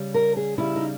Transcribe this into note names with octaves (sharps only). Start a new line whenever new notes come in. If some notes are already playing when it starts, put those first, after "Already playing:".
Already playing: C#3 G3
A#4
G#4
C#3 G3 E4
D#4